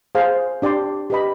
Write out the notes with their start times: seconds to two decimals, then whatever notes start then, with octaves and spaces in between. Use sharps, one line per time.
0.15 G#4 C5 F5
0.62 D4 G4 D5 G5 C6
1.10 G4 B4 D#5 B5